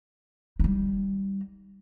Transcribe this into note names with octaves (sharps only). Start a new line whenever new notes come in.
G3 D#4